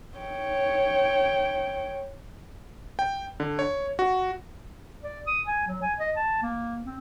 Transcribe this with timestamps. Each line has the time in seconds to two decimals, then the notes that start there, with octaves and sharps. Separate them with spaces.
0.18 C#5 G5
2.99 G5
3.40 D3
3.59 C#5
3.99 F#4
5.03 D5
5.27 D#6
5.47 G#5
5.67 F#3
5.82 G#5
5.99 D#5
6.16 A5
6.42 A#3
6.86 C4